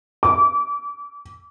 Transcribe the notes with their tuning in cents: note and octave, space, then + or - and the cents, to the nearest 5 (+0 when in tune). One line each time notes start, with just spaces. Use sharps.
D6 -30